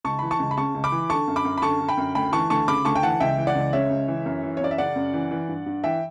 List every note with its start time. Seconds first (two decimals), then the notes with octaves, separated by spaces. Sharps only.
0.05 C#2 A5 C#6
0.19 E3 B5
0.31 A5 C#6
0.40 C#2
0.51 B5
0.57 C#3 A5 C#6
0.75 C#2
0.84 B5 D6
0.92 E3
1.10 D3 A5 C#6
1.27 F#2
1.36 B5 D6
1.45 F#2
1.58 B5
1.62 D3 A5 C#6
1.80 D3
1.89 G5 B5
1.97 F#2
2.15 D2 G5 B5
2.33 E3 A5 C#6
2.50 D2 A5 C#6
2.68 C#3 B5 D6
2.85 D2 A5 C#6
2.95 G5
3.03 E3 F#5 A5
3.20 C#2 E5 G5
3.38 E3
3.47 D5 F#5
3.55 C#2
3.73 C#3 C#5 E5
3.90 C#2
4.08 E3
4.26 F#2
4.43 E3
4.57 C#5
4.61 F#2 D5
4.71 E5
4.78 C#3 D5 F#5
4.96 F#2
5.14 E3
5.31 E3
5.48 G2
5.66 G2
5.84 E3 E5 G5